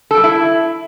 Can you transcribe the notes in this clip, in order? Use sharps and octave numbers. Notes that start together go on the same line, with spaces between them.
A4
G3
E4